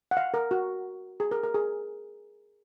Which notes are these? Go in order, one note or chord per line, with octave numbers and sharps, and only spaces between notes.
F#5
F5
A#4
F#4
G#4
A#4
A#4
G#4